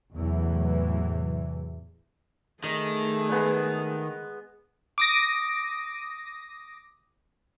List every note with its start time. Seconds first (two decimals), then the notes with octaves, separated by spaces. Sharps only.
0.15 E2 A2 C3 E3 F#3
2.64 D#3 A3 G#4 D#5
3.29 G#3 B3
4.98 D6 D#6 A#6